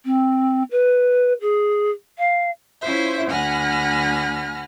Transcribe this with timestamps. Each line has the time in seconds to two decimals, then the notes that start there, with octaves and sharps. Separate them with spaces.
0.05 C4
0.71 B4
1.41 G#4
2.18 F5
2.82 C#4 E4 F4 C5 E5
3.30 D2 F#5 G#5 B5 F6 A#6